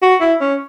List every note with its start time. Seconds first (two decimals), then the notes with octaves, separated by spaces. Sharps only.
0.02 F#4
0.21 E4
0.41 C#4